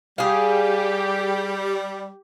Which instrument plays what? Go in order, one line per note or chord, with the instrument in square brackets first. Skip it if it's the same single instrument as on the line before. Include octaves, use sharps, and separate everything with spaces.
[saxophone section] G3 [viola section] G4 [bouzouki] G#4 F5